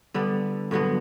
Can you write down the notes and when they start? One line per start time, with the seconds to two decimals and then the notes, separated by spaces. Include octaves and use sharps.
0.14 D3 G3 B3 D5
0.71 G2 D3 F#3 B3